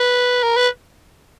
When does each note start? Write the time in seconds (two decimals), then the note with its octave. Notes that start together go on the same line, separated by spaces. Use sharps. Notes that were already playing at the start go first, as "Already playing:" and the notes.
Already playing: B4
0.43 A#4
0.57 B4